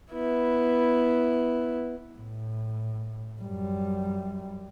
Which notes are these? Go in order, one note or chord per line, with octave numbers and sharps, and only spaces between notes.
B3 E4
A2
F#2 G3